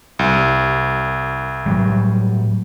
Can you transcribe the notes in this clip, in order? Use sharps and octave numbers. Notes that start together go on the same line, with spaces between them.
C2
A2 F#3 G3